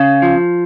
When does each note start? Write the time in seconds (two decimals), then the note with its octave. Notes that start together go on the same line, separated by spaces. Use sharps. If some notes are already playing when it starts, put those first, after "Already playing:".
Already playing: C#3
0.22 F3